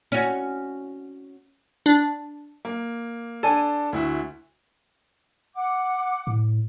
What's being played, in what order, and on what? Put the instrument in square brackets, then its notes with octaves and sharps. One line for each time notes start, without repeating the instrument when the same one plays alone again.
[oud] C#4 F#4
[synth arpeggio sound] D4
[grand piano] A#3
[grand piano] D4 A4 [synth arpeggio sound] G#5
[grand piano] D2 E4 F#4
[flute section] F#5 D6
[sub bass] A2